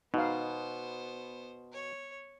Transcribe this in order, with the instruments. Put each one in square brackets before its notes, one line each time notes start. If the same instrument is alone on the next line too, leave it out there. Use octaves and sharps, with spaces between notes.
[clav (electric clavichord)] B2 [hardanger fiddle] B3 C5 [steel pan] D#4 F5
[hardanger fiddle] C#5